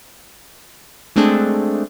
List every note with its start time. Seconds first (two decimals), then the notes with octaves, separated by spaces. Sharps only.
1.16 G#3 A3 C4 D4 G#4